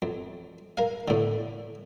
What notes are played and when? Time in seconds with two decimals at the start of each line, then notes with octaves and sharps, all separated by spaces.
0.02 F2
0.77 A#4 F5
1.08 A2 D3